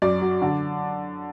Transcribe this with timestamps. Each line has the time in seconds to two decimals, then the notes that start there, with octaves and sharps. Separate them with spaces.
0.02 F#2 D5
0.22 F#3
0.42 D3